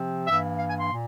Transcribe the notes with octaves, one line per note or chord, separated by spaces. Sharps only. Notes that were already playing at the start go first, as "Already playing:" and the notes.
Already playing: C3 F3 C4
G2 E3 A#3 E5
F5
G#5
C6
A#2